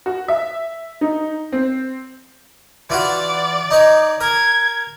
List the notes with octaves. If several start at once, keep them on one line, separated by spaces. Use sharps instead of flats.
F#4
E5
D#4
C4
E3 F4 F#4 D5
D#4 C#5
A#4 G#6